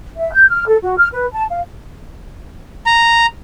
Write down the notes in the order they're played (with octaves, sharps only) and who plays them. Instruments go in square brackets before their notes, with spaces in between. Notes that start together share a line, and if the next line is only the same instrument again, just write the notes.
[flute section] E5
G6
F6
A4
F#4
F6
B4
A5
F5
[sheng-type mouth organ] A#5